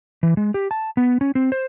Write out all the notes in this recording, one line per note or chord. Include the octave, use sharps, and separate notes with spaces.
E3
G#3
G4
A5
B3
C#4
C4
C5